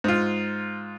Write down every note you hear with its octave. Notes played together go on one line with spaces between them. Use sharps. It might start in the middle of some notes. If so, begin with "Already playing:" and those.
G#2 F4